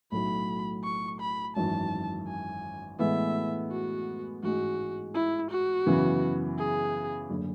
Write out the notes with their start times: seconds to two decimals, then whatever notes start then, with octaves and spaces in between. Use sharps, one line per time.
0.12 B1 A2 F#3 B5
0.84 C#6
1.20 B5
1.56 G#1 F#2 E3 A5
2.27 G#5
2.99 A2 E3 G#3 B3 E5
3.71 F#4
4.43 A1 G#2 G#3 F#4
5.14 E4
5.51 F#4
5.86 F#2 C#3 E3 B3
6.58 G#4
7.30 F#1 D3